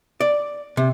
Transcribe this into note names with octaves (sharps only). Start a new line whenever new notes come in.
D5
C3